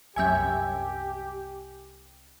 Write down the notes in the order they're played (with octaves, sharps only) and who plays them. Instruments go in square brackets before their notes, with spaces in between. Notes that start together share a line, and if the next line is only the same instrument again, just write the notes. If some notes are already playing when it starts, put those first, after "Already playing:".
[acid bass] C2 [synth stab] F#2 E5 G#6 [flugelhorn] G4 [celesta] G#5 G6